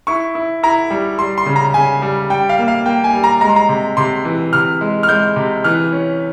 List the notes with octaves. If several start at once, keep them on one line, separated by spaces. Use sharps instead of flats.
E4 C#6
E4
E4 A#5
G3
G3 C6
C6
C#3
A#5
C#3 G#5
G3
G3 G5
F5
A#3
F5
A#3 G5
G#5
G3
A#5
G#3 A#5
C6
A#5
C3
C3 C6
E3
C3 F6
G#3
F6
G#3 G6
C3
E3 F6
C#4